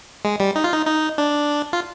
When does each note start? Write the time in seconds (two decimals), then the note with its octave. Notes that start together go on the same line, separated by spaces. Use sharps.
0.25 G#3
0.40 G3
0.56 D#4
0.64 F4
0.72 D#4
0.86 D#4
1.18 D4
1.73 F4